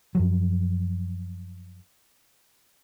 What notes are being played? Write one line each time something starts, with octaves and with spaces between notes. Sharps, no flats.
F#2 F3 F#3